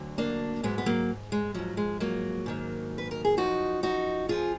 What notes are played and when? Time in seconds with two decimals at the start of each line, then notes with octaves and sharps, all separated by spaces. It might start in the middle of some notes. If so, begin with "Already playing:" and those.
Already playing: D2 D3 F#3
0.18 A#3 D4
0.63 G#2 F#3 G#3 B3
0.78 B3
0.86 F#3 A#3
1.32 G#3
1.54 G#2 F3 F#3
1.77 G#3
2.00 F#3 A#3
2.46 G#2 D#3 F#3
2.98 B4
3.11 A#4
3.25 G#4
3.37 F#2 F3 D#4 F#4
3.83 D#4 F#4
4.29 F2 F3 F4 G#4